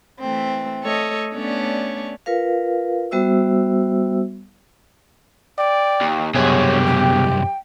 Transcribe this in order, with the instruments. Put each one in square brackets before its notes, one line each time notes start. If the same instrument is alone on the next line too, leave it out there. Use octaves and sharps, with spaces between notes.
[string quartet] E3 A3 C4
A3 A4 C#5 D#5
A3 B3 C#4 D4 C#5 D5
[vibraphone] F4 A#4 B4 F5
G3 B3 F#4 C5 E5 E6
[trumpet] D5 [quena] G5
[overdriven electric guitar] D#2
[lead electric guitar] C2 F#2 [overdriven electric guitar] B2 G#4 [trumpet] G4 [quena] C#5
[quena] G5